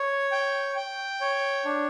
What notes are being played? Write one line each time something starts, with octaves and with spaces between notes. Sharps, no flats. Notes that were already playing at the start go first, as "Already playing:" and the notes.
Already playing: C#5
G5
G5
C#5
D4